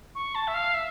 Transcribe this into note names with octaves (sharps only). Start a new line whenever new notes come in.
C#6
A5
E5
F5
E5